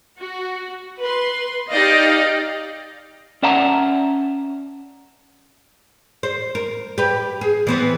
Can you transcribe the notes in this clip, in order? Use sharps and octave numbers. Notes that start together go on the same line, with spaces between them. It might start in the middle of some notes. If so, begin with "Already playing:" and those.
F#4
B4 C6
D#4 G4 D5 D#5 F5
C#4 D5 E5 F#5 A5 A#5
C5
A#4
G4 B4
G#4
E3 B3 C4